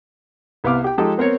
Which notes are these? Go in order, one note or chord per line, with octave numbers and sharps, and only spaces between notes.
C2 B3 F5 D6 F6
G4 G5
F3 G#3 D#4 G4 A4
B3 C4 A#4 C#5